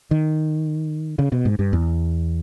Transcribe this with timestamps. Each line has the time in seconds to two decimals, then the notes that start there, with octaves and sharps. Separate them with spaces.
0.11 D#3
1.19 C#3
1.32 B2
1.45 G#2
1.59 G2
1.73 E2